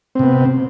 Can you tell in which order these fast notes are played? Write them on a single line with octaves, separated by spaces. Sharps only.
C4 C3 B3